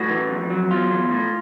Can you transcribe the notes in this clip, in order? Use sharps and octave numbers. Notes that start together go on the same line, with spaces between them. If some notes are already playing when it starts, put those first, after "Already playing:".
Already playing: A2 F#4
E3
F2
F#3
E2 F4
E2
A2